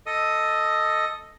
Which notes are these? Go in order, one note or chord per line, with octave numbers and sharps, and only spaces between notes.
A4 D#5 D#6